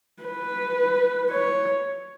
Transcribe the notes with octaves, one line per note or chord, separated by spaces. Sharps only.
B4
C#5